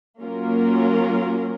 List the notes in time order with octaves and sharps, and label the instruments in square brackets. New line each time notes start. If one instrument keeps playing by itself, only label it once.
[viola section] F#3 A#3 C#4 F4 A#4